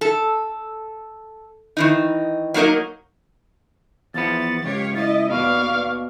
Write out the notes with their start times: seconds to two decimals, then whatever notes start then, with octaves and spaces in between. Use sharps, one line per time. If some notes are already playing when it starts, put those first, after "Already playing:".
0.01 A4
1.77 D#3 E3 D#4
2.54 F#3 A#3 D#4 A#4 D#5
4.14 E2 F3 B3 A6
4.64 C#2 G4 C#5 F5
4.95 E4 D#5 A6
5.31 D#2 B2 B3 D5 F5 C#6